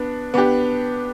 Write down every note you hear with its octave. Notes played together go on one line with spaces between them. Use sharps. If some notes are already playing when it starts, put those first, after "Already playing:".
Already playing: B3 D4
B3 D4 G4